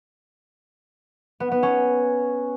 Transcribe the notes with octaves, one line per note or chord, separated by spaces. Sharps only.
B3
B3
C#4